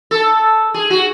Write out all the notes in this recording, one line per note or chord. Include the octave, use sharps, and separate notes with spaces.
A4
G#4
F#4